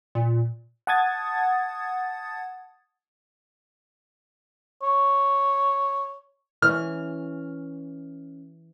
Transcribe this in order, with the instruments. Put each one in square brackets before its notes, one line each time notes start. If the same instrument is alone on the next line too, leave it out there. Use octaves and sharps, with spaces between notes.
[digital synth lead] A#2
[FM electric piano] F#5 A5 D#6 G#6 A6
[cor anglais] C#5
[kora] E3 C#4 [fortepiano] F6